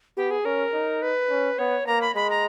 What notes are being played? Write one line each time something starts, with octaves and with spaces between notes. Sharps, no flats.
B3 G4
G#4
C#4 A#4
D#4
B4
C#4
B3 C#5
A#3 A#5
B5
G#3 B5
A#5